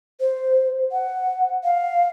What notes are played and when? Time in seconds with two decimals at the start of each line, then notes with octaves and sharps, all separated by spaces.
0.21 C5
0.92 F#5
1.64 F5